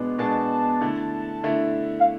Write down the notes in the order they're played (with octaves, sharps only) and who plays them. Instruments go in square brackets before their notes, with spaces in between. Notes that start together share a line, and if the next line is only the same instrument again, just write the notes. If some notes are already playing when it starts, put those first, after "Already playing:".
Already playing: [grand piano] B2 G#3 B3 D4
[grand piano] B2 G#3 B3 D4 [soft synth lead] A5
[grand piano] D3 A3 E4
D3 A3 E4
[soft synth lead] F5